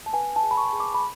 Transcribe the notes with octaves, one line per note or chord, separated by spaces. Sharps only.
A5
B4 G#5
A5
G#4
B5
C#6
G#4
D6
B5